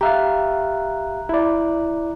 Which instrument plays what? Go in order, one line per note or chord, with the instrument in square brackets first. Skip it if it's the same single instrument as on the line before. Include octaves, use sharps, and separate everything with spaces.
[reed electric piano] G4 E5 F5 [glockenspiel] A#5 F#6
[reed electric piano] E4 D5